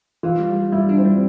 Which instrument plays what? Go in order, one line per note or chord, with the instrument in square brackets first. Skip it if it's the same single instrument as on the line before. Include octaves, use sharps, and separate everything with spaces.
[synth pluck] E3 [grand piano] F4
[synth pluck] G3
G3
[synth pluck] G3 [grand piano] E4
[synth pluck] D4
[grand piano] C4
[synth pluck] G3